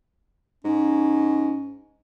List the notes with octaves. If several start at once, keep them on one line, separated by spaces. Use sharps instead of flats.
G#2 C#4